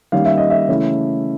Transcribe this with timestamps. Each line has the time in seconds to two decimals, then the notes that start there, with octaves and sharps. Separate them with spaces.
0.12 D#3 G3 A#3 C#4 F5
0.26 E5
0.38 D#5
0.50 E5
0.68 C#3 E3 A3 C#4 E4